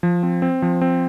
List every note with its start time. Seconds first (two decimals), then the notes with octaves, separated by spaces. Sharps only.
0.03 F3
0.23 C4
0.42 C4
0.62 F3
0.81 C4